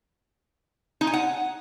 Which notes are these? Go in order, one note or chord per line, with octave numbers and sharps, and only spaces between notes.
D#4
G#5
F#5